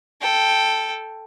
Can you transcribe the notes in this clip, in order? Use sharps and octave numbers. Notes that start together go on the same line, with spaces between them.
A4 G5